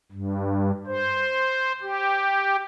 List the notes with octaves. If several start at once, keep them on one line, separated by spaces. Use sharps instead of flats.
G2
C5
G4